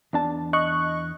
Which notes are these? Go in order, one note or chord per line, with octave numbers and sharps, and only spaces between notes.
E2 D4 A5
D#5 C#6 F#6